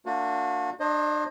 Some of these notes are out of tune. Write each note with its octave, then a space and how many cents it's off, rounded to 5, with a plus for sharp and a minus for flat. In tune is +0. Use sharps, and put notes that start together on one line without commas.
A#3 -35 D4 +0 F#4 -40
D4 +35 C5 +35 D#5 +0